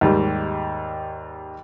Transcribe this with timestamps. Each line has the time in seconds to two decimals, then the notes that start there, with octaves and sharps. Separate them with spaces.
0.01 D#2 G#2 G3